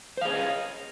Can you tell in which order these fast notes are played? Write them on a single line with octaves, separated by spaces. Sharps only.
C5 F5 G#4 C#5 D#5